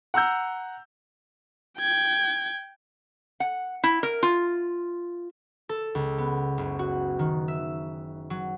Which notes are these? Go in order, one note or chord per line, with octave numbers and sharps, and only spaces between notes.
F#5 A#5 E6 G6
G5 G#6
F#5
E4
A#4
F4
A4
C#2
B3
F#1
F#4
D#3
E5
F#3